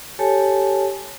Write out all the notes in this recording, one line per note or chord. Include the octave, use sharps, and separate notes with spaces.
G4 A4 C#5 G#5 A5